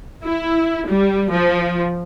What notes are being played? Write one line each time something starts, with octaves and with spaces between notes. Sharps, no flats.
E4
G3
F3